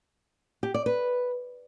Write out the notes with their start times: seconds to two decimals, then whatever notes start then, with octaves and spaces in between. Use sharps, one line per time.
0.63 G4
0.74 D5
0.86 B4